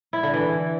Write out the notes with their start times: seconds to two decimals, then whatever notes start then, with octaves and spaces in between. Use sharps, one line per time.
0.13 E4
0.23 D3
0.34 E3